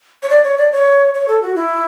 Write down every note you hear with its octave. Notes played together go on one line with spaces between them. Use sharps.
C#5
D5
C#5
D5
C#5
C#5
A4
F#4
E4